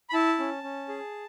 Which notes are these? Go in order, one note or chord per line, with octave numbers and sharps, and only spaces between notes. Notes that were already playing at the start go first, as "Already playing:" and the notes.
B5
E4 A5
C#4
C#4
G#4